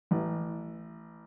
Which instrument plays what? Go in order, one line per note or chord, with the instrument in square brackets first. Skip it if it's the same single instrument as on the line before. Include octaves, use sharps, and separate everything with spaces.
[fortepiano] A1